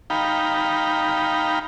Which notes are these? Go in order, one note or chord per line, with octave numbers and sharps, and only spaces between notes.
D#4 F5 G5 A#5 B5